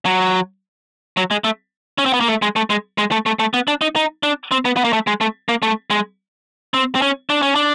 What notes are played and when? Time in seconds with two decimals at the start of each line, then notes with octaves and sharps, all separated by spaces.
0.06 F#3
1.17 F#3
1.31 G#3
1.44 A3
1.98 C#4
2.06 C4
2.14 B3
2.20 A#3
2.28 A3
2.42 G#3
2.56 A3
2.70 G#3
2.98 G#3
3.11 A3
3.26 A3
3.39 A3
3.54 B3
3.68 D4
3.81 D#4
3.96 D#4
4.23 D4
4.51 C4
4.65 B3
4.77 B3
4.84 A#3
4.93 A3
5.07 G#3
5.21 A3
5.49 A#3
5.63 A3
5.90 G#3
6.74 C4
6.95 C4
7.02 C#4
7.30 D4
7.43 C#4
7.56 D4